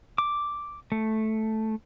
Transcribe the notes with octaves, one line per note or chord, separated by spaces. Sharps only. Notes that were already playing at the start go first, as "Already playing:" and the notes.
D6
A3